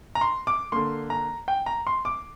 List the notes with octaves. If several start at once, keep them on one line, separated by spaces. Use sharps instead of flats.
A#5
C6
D6
D3 A#3 C6
A#5
G5
A#5
C6
D6